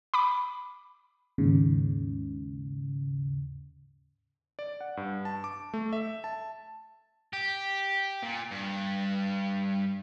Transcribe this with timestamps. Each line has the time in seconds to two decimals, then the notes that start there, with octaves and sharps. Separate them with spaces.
0.14 B5 D6
1.38 D#2 G#2 C#3
4.59 D5
4.81 F#5
4.97 G2
5.25 A5
5.44 D6
5.74 A3
5.93 E5
6.24 A5
7.33 G4
8.22 A#2
8.51 G2